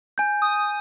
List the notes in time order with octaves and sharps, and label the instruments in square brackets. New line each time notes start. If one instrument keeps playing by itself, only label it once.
[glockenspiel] G#5 G6
[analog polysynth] D#6